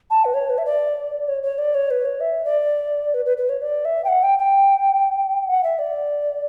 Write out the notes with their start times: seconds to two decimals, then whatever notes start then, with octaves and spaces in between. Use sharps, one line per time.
0.10 A5
0.25 B4
0.34 C#5
0.50 B4
0.58 E5
0.65 D5
1.28 C#5
1.43 C#5
1.58 D5
1.74 C#5
1.90 B4
2.05 C#5
2.20 E5
2.45 D5
3.14 B4
3.26 B4
3.37 B4
3.49 C#5
3.62 D5
3.85 E5
4.04 G5
4.08 F#5
4.23 G5
4.39 G5
5.48 F#5
5.63 E5
5.79 D5